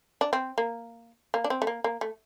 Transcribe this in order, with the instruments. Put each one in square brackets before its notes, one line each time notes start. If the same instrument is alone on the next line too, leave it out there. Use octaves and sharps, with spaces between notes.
[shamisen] D4
C4
A#3
A#3
D4
C4
A3
A#3
A#3
A3